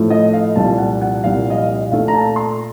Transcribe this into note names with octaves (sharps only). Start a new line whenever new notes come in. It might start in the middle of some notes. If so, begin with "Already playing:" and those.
Already playing: A2 F3 A3
D#5
F5
C2 A#2 F3 A5
F#5
F#5
C2 A#2 F3 F5
D#5
F5
A#2 A3 F5
A#5
A5
C6